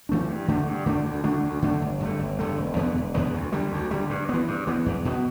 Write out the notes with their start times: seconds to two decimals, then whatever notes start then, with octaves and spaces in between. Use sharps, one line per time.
0.09 E3 A3 D4
0.28 G2
0.48 D3 A3 D4
0.67 G2
0.86 D3 A3 D4
1.05 D2
1.24 D3 A3 D4
1.43 D2
1.62 D3 A3 D4
1.82 G1
2.00 G2 D3 A3
2.19 G1
2.39 G2 D3 A3
2.57 E1
2.76 E2 D3 B3
2.95 E1
3.15 E2 D3 B3
3.34 D2
3.52 D3 G3
3.72 D2
3.91 D3 G3
4.10 G2
4.29 E3 B3
4.48 G2
4.67 E3 B3
4.86 E2
5.05 B2 B3